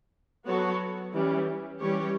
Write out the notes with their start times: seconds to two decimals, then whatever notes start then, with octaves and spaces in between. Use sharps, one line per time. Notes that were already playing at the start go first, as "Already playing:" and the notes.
0.46 F#3 B3 F#4 A4 C#5
1.13 E3 G3 C#4 G4
1.80 E3 G3 C#4 G4 C#5